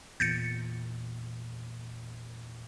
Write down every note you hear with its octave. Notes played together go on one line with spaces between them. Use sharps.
E2 A#2 G6 A6 C#7